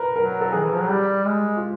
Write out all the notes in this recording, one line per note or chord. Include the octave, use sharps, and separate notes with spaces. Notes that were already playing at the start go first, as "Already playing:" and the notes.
Already playing: A#4 B4
F#3 A#4
A4
D#3 G#4
E3
F3
F#3
G3 G4
G#3
F4